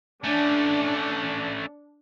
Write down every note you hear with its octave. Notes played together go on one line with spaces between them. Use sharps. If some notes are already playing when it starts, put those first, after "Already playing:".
A3 C#4 D4